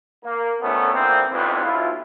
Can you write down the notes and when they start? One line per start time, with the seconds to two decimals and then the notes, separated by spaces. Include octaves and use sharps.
0.24 A#3
0.62 D2 D#3 A3 B3 C#4 A4
0.93 D3 E3 F3 A#3 C4
1.31 A1 E2 G#2 C4 F4 B4
1.64 B1 E4 F4